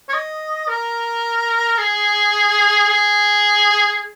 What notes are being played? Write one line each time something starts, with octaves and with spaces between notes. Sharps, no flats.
C#5
D#5
A#4
G#4
G#4